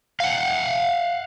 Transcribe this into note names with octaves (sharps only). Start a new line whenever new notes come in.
F5 F#5